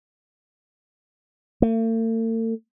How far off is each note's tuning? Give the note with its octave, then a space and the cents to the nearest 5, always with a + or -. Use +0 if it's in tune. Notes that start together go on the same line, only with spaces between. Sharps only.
A3 +45